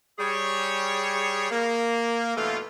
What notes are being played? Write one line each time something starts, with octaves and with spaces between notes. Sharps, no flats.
G3 G#4 C#5
A#3
G2 B2 E3 A3 F4